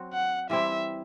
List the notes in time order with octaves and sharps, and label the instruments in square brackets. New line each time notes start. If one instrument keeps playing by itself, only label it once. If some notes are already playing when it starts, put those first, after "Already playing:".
Already playing: [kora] F#3 C4 F#4
[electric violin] F#5
[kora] E3 G3 C4 E4 [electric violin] E5